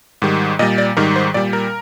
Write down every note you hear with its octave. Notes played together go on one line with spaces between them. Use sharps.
G#2 D#3 G3
A#2 G3 D#5
D5
G#2 D#3 G3 A#4
C5
A#2 G3 D5
A#4